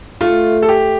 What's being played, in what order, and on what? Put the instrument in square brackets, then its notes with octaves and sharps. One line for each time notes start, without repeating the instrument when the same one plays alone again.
[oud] A3 [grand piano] F4
[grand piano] A4
G4